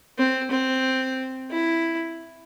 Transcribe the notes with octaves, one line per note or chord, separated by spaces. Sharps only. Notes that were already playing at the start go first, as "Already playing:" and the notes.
C4
C4
E4